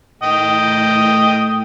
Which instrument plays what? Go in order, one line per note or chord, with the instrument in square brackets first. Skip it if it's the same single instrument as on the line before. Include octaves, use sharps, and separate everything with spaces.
[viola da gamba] A2 A3 [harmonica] D#5 G5